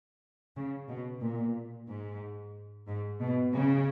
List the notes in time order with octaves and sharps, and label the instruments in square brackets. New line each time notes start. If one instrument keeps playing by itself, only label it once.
[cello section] C#3
B2
A#2
G#2
G#2
B2
C#3